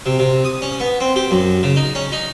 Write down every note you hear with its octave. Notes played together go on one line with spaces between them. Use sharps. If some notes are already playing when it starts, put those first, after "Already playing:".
C3
C3
D#6
C#4
B3
C4
G4
F#2
C#3
D#4
C#4
D#4